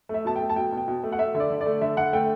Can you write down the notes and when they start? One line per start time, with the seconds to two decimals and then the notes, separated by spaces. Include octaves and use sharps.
0.09 A3 E5
0.25 B2 A5
0.36 G5
0.41 A3
0.50 A5
0.56 B2 G5
0.72 B2 G5
0.88 B2
1.03 A3
1.12 F#5
1.19 A3 E5
1.34 D3 E5
1.40 D5
1.50 D3
1.61 D5
1.66 A3
1.81 D3 E5
1.97 D3 F#5
2.13 A3 G5